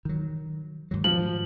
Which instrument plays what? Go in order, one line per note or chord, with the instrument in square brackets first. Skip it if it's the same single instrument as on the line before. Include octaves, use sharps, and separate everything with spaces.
[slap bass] D#3 F#3
G#2 D#3 F#3
[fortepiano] F3 [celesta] F#7